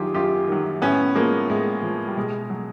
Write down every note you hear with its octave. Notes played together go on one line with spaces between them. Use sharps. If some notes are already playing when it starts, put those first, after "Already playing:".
Already playing: F#2 D#3 F#3 E4 F4 G4 G#4
F#2 F4 G4
D#3 F#3
A2 B3 C#4
F3 G#3 A#3
A2 G#3
F3
G3
B2 G#3
F#3